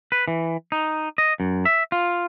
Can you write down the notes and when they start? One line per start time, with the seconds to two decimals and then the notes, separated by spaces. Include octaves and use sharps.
0.12 B4
0.28 E3
0.72 D#4
1.18 D#5
1.40 F#2
1.65 E5
1.92 F4